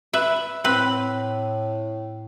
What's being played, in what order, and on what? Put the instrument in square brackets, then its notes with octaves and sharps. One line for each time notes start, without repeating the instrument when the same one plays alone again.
[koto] B4 E5
[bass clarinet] A2 [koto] C4 B4